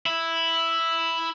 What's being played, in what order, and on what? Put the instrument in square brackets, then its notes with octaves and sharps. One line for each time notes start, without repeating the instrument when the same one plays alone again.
[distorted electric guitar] E4